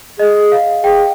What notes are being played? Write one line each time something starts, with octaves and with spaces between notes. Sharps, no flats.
G#4 D#5
F5
G#4 G5